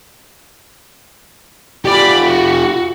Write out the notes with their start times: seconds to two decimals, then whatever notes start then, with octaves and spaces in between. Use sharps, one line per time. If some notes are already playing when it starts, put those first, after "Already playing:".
1.85 F4 G4 D5 B5
2.26 F#4